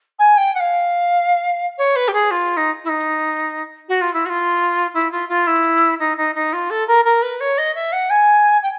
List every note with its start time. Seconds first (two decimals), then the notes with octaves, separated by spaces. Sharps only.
0.19 G#5
0.37 G5
0.55 F#5
0.59 F5
1.78 C#5
1.95 B4
2.08 G4
2.13 G#4
2.30 F4
2.56 D#4
2.84 E4
2.88 D#4
3.88 F#4
4.01 F4
4.13 E4
4.25 F#4
4.29 F4
4.94 E4
5.11 F4
5.28 F4
5.47 E4
5.99 D#4
6.17 D#4
6.35 D#4
6.52 F4
6.70 A4
6.87 A#4
7.04 A#4
7.22 B4
7.40 C#5
7.58 D#5
7.75 E5
7.92 F#5
8.10 G#5
8.62 G5